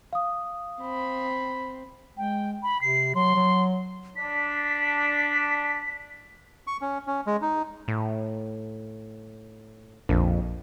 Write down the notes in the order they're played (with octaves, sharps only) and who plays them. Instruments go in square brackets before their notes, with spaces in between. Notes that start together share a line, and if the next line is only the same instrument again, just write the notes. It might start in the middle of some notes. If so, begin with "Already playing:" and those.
[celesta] F5 D#6
[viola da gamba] C4 [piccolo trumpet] B5
[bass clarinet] G#3 [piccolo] G5
[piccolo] B5
[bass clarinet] C3 [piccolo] C7
[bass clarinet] F#3 [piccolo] C6
[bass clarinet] F#3
[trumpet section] D4 [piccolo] B6
[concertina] C#6
C#4
C#4
G#3
D#4
[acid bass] A2
[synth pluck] A#1 [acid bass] F2